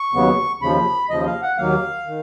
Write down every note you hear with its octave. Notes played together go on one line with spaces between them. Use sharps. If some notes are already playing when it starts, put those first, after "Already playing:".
Already playing: C#6
D#2 C#3 F#3 B3
D#2 C#3 F3 B5
D#2 C#3 F3 D#5
F5
F#5
D#2 D#3 F#3 A#3 F5
D#3